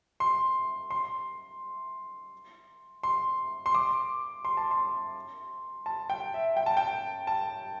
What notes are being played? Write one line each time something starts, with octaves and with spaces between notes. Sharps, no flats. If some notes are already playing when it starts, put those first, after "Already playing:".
C6
C6
C6
C6
D6
C6
A5
C6
A5
G5
E5
G5
A5
G5
A5